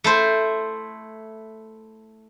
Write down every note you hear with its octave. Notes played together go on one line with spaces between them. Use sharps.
A3 E4 C5